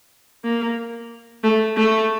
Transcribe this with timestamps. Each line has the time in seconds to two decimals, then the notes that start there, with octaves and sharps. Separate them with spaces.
0.44 A#3
1.44 A3
1.76 A3